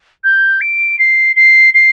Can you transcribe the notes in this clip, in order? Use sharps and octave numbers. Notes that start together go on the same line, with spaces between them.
G6
D7
C7
C7
C7